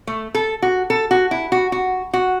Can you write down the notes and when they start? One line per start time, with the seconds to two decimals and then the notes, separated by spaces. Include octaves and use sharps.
0.07 A3
0.34 A4
0.62 F#4
0.90 A4
1.11 F#4
1.31 E4
1.52 F#4
1.72 F#4
2.13 F#4